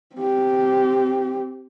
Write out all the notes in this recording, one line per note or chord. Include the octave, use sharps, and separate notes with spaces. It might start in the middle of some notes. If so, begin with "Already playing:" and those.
C4 G4